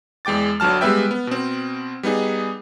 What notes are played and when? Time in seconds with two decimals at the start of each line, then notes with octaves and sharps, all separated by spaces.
0.25 E2 G#3 G5 D6 A6
0.60 G1 D3 F#3 A5 F6
0.81 G3 G#3 B3 B4 E5 G5
1.11 B3
1.27 B2 C4
2.03 G3 B3 D#4 G#4